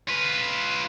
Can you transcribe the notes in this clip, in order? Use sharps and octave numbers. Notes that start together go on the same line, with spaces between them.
F4 B4